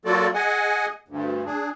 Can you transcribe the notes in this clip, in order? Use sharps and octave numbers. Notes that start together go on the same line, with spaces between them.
F#3 A#3 F4 F#4 A4 D5
G#4 D#5 F#5 G#5
D2 G2
D4 G#4